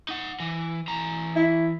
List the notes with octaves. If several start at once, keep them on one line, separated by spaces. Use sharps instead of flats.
D#4 F#5
E3
E3 A#5
E4